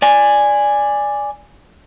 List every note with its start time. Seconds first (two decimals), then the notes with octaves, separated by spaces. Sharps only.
0.02 D5 G#5